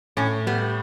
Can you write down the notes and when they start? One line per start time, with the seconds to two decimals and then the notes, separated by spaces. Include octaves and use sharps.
0.17 A2 C#4
0.47 G3 B3